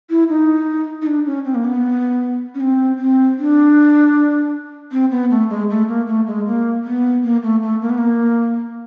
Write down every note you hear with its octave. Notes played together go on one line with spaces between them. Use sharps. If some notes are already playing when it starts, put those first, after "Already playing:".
E4
D#4
D#4
D4
C#4
C4
A#3
B3
C#4
C4
C4
D4
C4
B3
A3
G#3
A3
A#3
A3
G#3
A#3
B3
A#3
A3
A3
A#3
B3
A#3